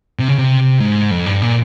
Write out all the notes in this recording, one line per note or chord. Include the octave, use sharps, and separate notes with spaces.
C3
C#3
C3
G#2
F2
G2
A#2